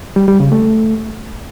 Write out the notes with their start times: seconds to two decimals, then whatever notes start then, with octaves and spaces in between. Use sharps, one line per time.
0.16 G3
0.28 G3
0.40 C#3
0.52 A3